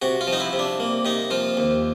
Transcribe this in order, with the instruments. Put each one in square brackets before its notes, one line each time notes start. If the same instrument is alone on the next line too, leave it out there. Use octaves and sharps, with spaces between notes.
[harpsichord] C3 F#4
F4
F3
D#4
E4
C3
D4
A#3
C3 D#4
F3 F4
D#2